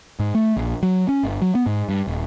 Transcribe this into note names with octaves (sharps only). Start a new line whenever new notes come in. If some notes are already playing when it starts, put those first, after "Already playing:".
G#2
A3
A#1
F#3
C#4
G1
F#3
B3
G#2
G2
D#1